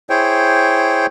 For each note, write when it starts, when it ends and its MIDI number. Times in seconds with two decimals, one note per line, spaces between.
0.10 1.06 64
0.10 1.06 68
0.10 1.06 72
0.10 1.06 73
0.10 1.06 79